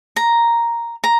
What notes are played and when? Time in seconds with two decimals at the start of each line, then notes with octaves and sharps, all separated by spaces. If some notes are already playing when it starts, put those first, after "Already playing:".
0.16 A#5
1.04 A#5